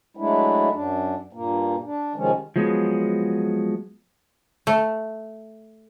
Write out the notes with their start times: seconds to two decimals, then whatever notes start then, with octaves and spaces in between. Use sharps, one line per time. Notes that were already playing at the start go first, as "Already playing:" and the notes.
0.17 F#3 G#3 A3 D4 E4
0.72 F#2 D4
1.33 G2 A#2 A#3
1.84 D4
2.16 C3 D#3 F3 G#3 C#4
2.56 F3 F#3 G#3 B3
4.67 A3